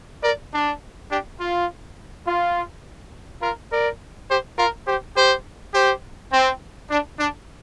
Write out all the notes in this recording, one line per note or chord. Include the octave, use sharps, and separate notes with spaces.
A#4 D5
D4
D4 G4
F4
F4
F4 A#4
A#4 D5
G4 C5
F4 A#4
G4 C5
G4 C5
G4 C5
C4
D4
D4